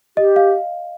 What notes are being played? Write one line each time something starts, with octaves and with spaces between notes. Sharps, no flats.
G4 D#5
F5